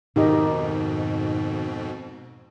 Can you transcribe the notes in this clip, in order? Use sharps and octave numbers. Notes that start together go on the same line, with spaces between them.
F2 G#2 B2 D#3 D#4 G4 D#5